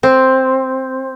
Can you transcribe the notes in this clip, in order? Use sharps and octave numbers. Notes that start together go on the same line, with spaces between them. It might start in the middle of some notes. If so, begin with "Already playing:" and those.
C4